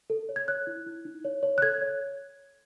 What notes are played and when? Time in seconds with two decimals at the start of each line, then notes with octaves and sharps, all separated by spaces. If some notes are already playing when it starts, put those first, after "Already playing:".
0.10 A4
0.29 C#5
0.36 G#6
0.48 C#5 F#6
0.67 E4
0.86 E4
1.05 D#4
1.24 C#5
1.43 C#5
1.58 F#6
1.62 A4 G#6
1.82 C#5